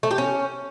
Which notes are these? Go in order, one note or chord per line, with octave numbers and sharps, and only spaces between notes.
A3
G4
C#4